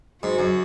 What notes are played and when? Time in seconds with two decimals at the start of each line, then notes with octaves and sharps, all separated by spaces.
0.23 G#2 F#4
0.39 F#2